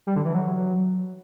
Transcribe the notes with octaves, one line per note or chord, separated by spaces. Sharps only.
G3
D3
E3
F#3